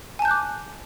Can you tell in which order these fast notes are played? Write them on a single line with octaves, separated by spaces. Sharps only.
G#5 A5 G6 F#6 D6